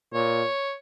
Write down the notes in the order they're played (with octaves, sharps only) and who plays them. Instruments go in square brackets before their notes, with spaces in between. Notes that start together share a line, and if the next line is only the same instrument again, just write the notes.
[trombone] A#2 [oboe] C#5